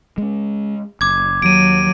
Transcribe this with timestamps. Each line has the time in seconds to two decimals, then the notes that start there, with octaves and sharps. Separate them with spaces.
0.18 G#3 C#4
1.01 F#1 D6 G#6
1.42 D#2 F#3 D7 D#7